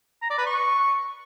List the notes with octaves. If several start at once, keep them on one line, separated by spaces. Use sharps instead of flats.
A#5
D5
B4
C#6